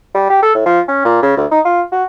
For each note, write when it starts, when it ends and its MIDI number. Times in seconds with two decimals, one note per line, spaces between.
0.15 0.26 55
0.30 0.38 67
0.42 0.50 69
0.55 0.64 45
0.66 0.80 53
0.88 1.03 61
1.05 1.20 46
1.22 1.37 49
1.37 1.46 38
1.51 1.60 63
1.65 1.82 65
1.92 2.04 66